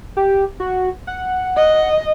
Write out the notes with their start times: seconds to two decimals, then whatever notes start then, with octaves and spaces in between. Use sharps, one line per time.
0.17 G4
0.60 F#4
1.07 F#5
1.57 D#5